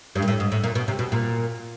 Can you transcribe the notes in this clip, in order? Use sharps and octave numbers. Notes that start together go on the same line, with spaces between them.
G2
A#2
A2
G#2
A2
A#2
B2
C3
B2
A#2